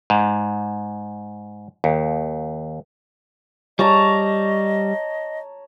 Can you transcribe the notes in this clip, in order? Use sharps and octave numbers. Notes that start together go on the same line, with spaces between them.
G#2
D#2
G3 C#5 D#5 A5 A#5